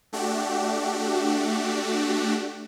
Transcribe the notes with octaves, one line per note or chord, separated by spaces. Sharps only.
A3 D4 F#4 G4